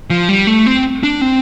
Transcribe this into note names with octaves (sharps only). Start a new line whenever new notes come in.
F3
G3
A3
C4
D4
C4